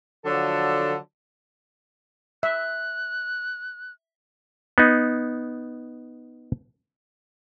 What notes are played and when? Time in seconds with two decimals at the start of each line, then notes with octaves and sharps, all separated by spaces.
0.24 D3 F3 F#3 A4 D5
2.43 E5 F#6
4.78 B3 D#4